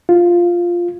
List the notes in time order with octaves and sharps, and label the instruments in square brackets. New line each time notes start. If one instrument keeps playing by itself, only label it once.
[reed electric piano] F4